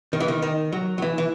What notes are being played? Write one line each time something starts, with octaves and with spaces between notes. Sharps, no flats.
D#3
E3
D#3
D#3
F#3
F#3
E3
E3